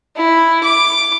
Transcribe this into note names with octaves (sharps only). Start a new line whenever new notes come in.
E4
D6